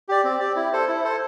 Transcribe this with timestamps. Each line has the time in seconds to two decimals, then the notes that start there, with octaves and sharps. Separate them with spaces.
0.09 G4 D5
0.24 C4
0.40 G4 D5
0.56 E4
0.73 A4 C5
0.88 E4
1.04 A4 C5